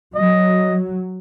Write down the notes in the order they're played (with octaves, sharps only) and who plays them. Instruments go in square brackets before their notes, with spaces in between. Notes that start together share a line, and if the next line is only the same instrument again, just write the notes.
[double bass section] F#3 [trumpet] D#5